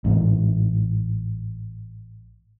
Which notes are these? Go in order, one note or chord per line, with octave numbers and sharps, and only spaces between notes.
A1 G#2